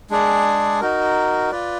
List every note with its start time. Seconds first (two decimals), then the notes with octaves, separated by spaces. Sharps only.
0.10 G#3 D4 G#4 D5
0.80 D#4 F#4 A#4
1.51 F4 B4 D5